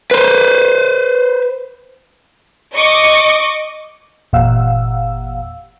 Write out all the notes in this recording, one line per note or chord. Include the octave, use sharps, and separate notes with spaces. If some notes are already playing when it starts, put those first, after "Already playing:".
B4 C5
D#5 C#6 D6
G1 E2 A#2 F5 F#5 E6